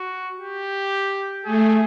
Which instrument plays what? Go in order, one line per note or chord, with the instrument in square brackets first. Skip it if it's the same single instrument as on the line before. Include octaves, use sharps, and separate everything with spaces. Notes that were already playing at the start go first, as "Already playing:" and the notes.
Already playing: [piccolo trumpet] F#4
G4
[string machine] A3 [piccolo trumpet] G#4